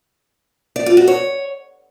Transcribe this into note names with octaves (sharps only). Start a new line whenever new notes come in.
D5
F4
F#4
C#5